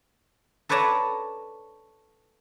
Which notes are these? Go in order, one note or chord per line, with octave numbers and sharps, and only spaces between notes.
A4 B4 C#5 D5 A5 A#5